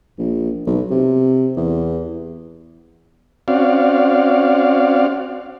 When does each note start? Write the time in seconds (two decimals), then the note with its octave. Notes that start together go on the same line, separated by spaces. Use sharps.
0.19 A#1
0.67 B1
0.91 C3
1.57 E2
3.48 C4 C#4 F#4 D5 F5